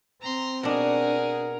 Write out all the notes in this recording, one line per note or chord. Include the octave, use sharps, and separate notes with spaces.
C4 A#5 C6
B2 D4 G#4 A#4 F#5